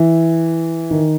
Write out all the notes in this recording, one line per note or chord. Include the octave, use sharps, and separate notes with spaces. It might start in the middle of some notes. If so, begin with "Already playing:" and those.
Already playing: E3
D#3